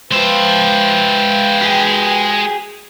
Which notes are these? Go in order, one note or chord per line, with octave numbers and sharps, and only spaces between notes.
G#3 F4 B4 C5 E5 G5
G4 G#4